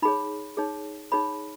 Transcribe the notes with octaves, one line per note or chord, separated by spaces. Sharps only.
D#4 G#4 C#5 B5
D#4 G#4 C#5
D#4 G#4 C#5 B5